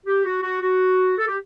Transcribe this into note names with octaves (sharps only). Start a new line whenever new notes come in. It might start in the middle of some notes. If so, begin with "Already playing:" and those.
G4
F#4
F#4
F#4
A4
G4